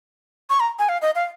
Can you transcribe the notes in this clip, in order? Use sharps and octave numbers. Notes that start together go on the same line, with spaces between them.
C#6
A#5
G#5
F5
D#5
F5